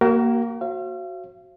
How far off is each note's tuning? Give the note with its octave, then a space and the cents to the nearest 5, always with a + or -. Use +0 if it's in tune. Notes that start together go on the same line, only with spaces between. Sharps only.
A#3 +0 F#4 +40 A#4 +0
F#4 +0 C5 +40 F5 -40